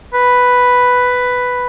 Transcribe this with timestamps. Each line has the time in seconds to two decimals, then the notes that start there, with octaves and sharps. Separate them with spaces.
0.13 B4